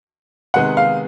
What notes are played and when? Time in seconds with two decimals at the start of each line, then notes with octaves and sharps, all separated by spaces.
0.54 C3 D#3 G#3 B3 D#4 F#5
0.77 F5